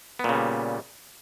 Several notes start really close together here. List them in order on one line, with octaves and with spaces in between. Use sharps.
B3 A#2 C#3 G3